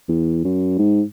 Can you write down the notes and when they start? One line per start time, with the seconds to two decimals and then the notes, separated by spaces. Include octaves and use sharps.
0.08 E2
0.44 F#2
0.79 G#2